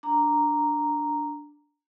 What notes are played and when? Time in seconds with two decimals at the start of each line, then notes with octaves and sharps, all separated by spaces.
0.03 D4 A#5